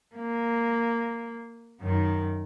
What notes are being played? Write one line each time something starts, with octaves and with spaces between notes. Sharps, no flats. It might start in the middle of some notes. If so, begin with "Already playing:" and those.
A#3
F#2 D#3